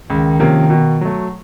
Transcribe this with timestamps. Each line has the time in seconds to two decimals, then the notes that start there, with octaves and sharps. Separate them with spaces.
0.09 C#2 D#3
0.40 C3 F3 A#3 C#4
0.70 B2
1.01 F#3 A3